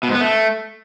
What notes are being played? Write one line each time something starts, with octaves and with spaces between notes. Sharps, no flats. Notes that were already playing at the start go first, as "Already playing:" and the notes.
B2
G#2
B3
A3